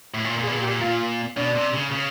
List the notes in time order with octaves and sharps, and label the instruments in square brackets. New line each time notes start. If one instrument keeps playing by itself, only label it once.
[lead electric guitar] A2
A#2
A#2
[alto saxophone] G#4
[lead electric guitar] B2
A#2
[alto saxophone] G4
[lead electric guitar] A#2
[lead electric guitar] A#2 [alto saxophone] F4
[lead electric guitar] B2 [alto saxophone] D4
[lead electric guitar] C3
C#3
C#3